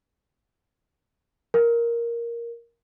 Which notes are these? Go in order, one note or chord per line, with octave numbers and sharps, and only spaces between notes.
A#4